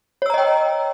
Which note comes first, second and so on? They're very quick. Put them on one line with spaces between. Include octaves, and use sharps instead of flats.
C#5 E6 A#5 D#5 G5